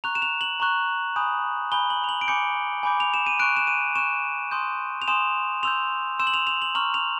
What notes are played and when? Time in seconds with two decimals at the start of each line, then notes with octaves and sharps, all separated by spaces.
0.04 A#5 C#6 F#6 F7
0.15 E7
0.22 F7
0.41 F#7
0.60 A#5 C#6 F#6
1.16 G#5 B5 D#6 G6
1.72 G#5 B5 D#6 G6 G7
1.90 F#7
2.04 F7
2.09 F#7
2.21 D7
2.28 G#5 B5 D6 G6 C#7
2.83 G#5 B5 D6 G6
3.00 F7
3.14 E7
3.26 D#7
3.40 C#6 F#6 D7
3.57 E7
3.67 D#7
3.96 C#6 F#6 E7
4.51 G#5 C6 D#6 G6
5.02 F7
5.08 G#5 C6 D#6 G6 E7
5.63 C6 E6 G6 F7
6.19 C6 E6 G6 E7
6.27 F#7
6.34 F7
6.47 F7
6.62 F#7
6.75 A#5 C#6 F6 F#7
6.94 F7